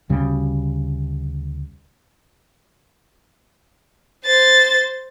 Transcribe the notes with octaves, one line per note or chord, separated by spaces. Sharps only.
D2 C#3 G3
C5 A6